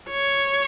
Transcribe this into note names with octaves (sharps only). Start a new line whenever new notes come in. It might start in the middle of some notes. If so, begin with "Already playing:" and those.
C#5